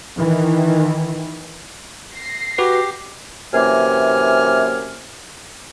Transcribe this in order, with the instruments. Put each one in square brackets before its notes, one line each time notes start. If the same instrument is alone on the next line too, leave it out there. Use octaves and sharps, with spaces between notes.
[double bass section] D#3 E3
[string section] A#6 C7
[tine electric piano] F#4 B4 [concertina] G4
[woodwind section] F#2 C3 E3 A#3 G#5 F6